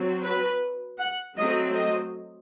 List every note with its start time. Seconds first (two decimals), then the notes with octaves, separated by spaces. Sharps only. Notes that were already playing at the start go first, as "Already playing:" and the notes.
Already playing: F#3 C4
0.23 B4
0.99 F#5
1.36 F#3 A3 C4 D#5
1.75 D#5